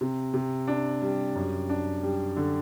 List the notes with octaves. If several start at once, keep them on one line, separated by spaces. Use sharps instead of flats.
C3
C3
D4
G3
F#2
D4
G3
D3